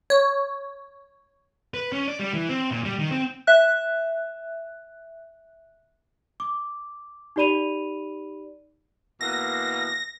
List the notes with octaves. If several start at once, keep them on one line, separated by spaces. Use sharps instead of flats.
C#5
B4
C#4
D5
G3
E3
C4
A#2
G3
D#3
C4
E5 F#6
D6
D#4 G4 D5 B5 D#7 F7
B2 E3 A#3 A#6